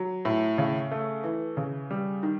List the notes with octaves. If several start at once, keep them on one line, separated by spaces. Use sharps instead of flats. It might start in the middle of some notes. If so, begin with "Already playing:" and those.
Already playing: F#3
A2
C#3
A3
E3
C#3
G3
D#3